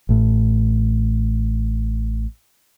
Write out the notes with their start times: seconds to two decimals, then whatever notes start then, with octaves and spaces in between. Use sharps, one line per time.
0.09 A1 A2